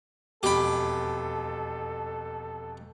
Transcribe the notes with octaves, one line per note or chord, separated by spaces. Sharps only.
E1 F2 G4 A4 B5 D7